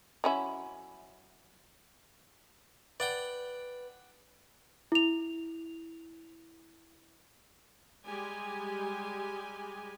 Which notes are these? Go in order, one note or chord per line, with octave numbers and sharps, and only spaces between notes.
F#3 C#4 E4
B4 D5 F#5 G5
E4 F7
G3 G#3 G4 G#5